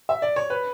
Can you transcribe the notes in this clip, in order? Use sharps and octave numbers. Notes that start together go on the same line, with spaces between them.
E5
D5
C#5
B4